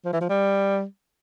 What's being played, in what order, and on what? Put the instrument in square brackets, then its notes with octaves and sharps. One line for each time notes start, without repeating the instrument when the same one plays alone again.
[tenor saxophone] F3
E3
F3
G3